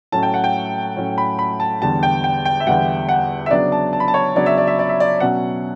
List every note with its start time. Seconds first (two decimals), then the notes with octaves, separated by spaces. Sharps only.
0.12 A2 F#3 A3 C#4 A5
0.23 G5
0.34 F#5
0.44 G5
0.96 A2 F#3 A3 C#4
1.18 B5
1.39 B5
1.60 A5
1.81 E2 D3 G3 B3 A5
2.03 G5
2.24 G5
2.45 G5
2.60 E5
2.67 E2 D3 G3 B3 F#5
3.09 F#5
3.46 E5
3.51 C#3 F#3 B3 D4 D5
3.72 A5
3.93 A5
4.00 B5
4.08 A5
4.14 C#5
4.36 C#3 F#3 B3 D4 D5
4.46 E5
4.58 D5
4.67 E5
4.79 D5
4.89 E5
5.00 D5
5.20 B2 F#3 C#4 F#5